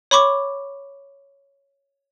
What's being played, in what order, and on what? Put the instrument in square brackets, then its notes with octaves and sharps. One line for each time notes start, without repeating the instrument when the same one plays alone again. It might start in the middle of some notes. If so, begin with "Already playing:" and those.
[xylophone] C#5 B5 C#6 D6